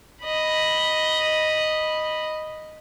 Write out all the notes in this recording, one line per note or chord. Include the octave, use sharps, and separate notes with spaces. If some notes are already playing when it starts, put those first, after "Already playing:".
D#5 B5